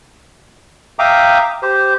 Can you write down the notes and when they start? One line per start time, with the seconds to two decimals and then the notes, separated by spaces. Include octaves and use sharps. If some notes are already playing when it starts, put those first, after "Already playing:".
0.99 E5 F5 G5 A#5 D6 D#6
1.62 G4 C5